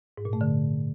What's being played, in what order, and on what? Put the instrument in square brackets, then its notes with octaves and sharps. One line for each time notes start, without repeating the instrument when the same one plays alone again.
[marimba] G#2
A#2
A3
D3